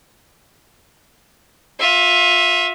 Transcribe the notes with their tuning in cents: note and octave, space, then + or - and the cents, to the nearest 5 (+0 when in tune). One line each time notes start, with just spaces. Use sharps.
F4 +25 E5 +0